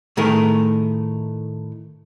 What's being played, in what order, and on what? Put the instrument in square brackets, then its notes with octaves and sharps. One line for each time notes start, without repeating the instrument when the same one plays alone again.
[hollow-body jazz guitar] A2 D#3 A3 D#4 G#4 A#4